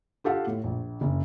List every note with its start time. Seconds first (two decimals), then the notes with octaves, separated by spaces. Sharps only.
0.24 F4 G4 A4 F5 F#5
0.47 A2
0.64 A#1
1.01 F#1